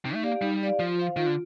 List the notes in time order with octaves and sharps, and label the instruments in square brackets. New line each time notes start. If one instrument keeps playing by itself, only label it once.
[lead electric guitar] C3 [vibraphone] D#4
[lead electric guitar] A3
[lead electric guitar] A#3 [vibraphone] G4 D5 F5
[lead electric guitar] G3 [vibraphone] D#4
[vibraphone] G4 D5 F5
[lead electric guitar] F3 [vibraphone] F4
[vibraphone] C5 F5
[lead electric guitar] D#3 [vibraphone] F4
[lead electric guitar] D3